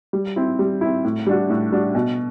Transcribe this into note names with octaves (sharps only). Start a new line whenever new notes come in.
G3
C4 E4
G3
C4 E4
A2
G3 D4 F#4
A2
G3 D4 F#4
B2